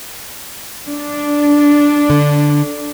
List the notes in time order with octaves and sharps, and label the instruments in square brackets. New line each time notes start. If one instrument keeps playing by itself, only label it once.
[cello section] D4
[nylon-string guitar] D3